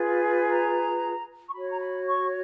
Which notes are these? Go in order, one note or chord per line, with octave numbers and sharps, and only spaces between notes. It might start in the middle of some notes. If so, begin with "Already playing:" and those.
Already playing: F4 G#4 B4
A#5
C#6
F#4 C#5 B5
A#5
B5
C#6